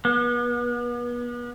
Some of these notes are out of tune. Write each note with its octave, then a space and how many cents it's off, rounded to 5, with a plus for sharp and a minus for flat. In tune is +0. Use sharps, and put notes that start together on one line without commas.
B3 -35